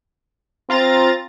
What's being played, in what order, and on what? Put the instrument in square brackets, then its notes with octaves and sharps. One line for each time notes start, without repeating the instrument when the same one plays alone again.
[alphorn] C4 [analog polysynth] F4 A#5 A6